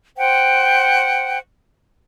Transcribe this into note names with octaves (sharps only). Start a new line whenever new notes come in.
C5 F#5 G5